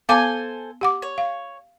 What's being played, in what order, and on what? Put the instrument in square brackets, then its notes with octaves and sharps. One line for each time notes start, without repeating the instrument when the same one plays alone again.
[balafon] B3 F5 D6 [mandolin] A4 C5 G#5
[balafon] G4 F#5 D6
[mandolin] C#5
[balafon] F5